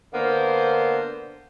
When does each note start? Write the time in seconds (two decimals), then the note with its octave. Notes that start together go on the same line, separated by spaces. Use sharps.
0.14 D3 A#3 B3 C5